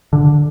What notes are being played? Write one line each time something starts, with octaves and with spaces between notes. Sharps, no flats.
D3